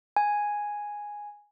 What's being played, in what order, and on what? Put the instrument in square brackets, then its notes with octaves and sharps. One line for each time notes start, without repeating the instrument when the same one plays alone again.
[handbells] G#5